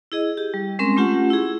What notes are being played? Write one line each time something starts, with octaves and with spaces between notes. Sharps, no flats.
E4 G#4 D#5
G4
G3
G#3 C4 C#4 A#4 C6
A3 C#4 F4 G4 F#5
E4 G#4